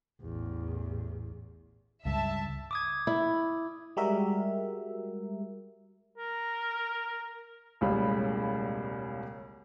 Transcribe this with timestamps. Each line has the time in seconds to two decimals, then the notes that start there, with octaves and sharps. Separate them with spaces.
0.22 A1 E2
2.05 C#2 G2 E5 A5
2.71 D6 D#6 G#6
3.07 E4
3.97 G3 G#3 F#4 G4 A#4 E5
6.18 A#4
7.81 E1 C#2 A2 C#3 G3 B5